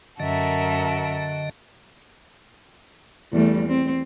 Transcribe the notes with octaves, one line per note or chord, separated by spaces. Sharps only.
F#2 D3 F#4 A4 A#4 D#5 E5
E2 G3 A3
C4